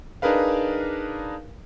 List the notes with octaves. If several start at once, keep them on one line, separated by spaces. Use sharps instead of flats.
D4 D#4 G#4 A#4 B4 F5